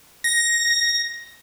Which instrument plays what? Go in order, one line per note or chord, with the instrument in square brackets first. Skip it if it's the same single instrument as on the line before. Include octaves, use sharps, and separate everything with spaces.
[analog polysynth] A#6